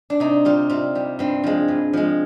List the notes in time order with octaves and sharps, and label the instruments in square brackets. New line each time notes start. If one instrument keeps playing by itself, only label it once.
[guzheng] D4
C3 D#4
G3 F4
C3 F4
G3
G2 C4
F3 G#3
G2
F3 G#3